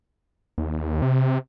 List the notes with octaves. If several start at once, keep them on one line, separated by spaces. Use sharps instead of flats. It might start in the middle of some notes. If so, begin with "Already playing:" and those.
D#2
C3